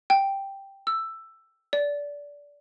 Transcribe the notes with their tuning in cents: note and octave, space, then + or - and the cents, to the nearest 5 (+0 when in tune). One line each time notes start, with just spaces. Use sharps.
G5 +0
E6 +10
D5 -20